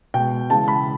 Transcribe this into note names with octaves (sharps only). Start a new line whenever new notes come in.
B2 G#3 G5
C#3 E3 G#3 A5
B5